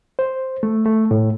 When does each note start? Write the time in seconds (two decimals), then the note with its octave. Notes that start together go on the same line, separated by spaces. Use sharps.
0.19 C5
0.63 A3
0.86 A3
1.11 A2